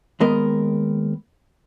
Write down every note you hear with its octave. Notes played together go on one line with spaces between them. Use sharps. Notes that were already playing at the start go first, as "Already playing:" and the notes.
D#2 G#3 B3 A#4 D#5